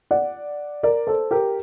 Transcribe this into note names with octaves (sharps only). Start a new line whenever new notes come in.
D5 F#5
A#4 D5
A4 C5
G4 A#4